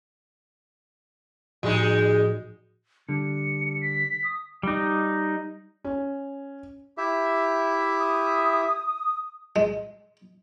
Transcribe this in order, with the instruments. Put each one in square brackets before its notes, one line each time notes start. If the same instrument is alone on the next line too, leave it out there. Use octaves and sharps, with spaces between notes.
[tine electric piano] A2 F3 F#4 [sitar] G3 G#3 D#4
[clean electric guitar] D3 G3 [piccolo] C#7
[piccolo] B6
D#6
[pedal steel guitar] G3 D#4
[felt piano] C#4
[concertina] E4 G4 E5
[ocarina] D#6
[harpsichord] G#3